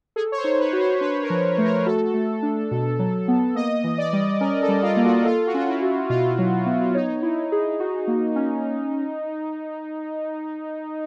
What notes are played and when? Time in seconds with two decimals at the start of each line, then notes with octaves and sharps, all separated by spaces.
0.16 G#4 A4
0.32 C#5
0.37 C5
0.44 D#4
0.59 B4
0.73 F#4
0.80 C5
1.01 D4 B4
1.23 A#4
1.30 F3
1.58 A3
1.65 A#4
1.86 F#4 A4
2.14 A3
2.43 D4
2.71 B2
2.99 F#3
3.28 B3
3.55 A#3 D#5
3.84 E3
3.98 D5
4.13 G3
4.40 C#4 A#4
4.62 A4
4.68 G3
4.83 F4
4.96 A#3
5.04 F#4
5.25 F4 A4
5.47 F#4
5.54 C#4 F4
5.68 E4
5.82 F#4
6.10 B2 F4
6.38 F#3
6.66 B3
6.94 D#4 C#5
7.23 E4
7.52 G#4
7.80 F#4
8.07 A#3
8.36 C#4